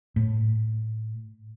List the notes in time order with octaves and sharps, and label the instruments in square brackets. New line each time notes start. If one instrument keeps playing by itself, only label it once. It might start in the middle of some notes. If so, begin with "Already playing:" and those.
[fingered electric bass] A2